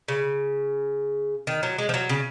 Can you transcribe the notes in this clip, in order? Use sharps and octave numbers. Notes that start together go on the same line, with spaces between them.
C#3
D#3
F#3
G#3
F3
F#3
C#3